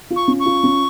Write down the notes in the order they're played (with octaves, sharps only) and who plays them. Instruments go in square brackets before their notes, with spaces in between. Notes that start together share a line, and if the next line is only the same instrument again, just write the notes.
[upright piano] F4
[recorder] C#6
[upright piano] C#4
[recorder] C#6
[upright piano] F4
C#4